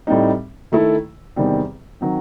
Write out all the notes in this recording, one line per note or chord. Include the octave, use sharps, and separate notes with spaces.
A2 G3 C4 D#4
D#3 A3 E4 A4
E2 C3 D#3 G3 C4
D#3 F#3 C4